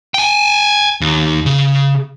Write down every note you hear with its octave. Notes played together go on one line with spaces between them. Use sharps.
G5 G#5
D#2
C#3